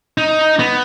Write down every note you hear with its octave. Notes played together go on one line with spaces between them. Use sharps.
D#4
B3